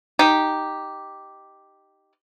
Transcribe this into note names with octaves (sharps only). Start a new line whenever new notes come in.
D#4 G4